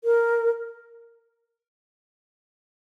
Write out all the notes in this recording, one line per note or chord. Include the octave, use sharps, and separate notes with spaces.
A#4